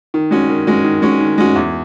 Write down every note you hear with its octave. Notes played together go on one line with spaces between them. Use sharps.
D#3
G#3 C#4 F#4
D#3
G#3 C#4 F#4
D#3
G#3 C#4 F#4
D#3
G#3 C#4 F#4
E2